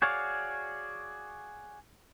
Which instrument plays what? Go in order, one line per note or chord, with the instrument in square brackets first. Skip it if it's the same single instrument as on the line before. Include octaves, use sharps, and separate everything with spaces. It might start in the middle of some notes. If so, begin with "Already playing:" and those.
[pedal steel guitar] F#4 G#4 C#5 D5 F5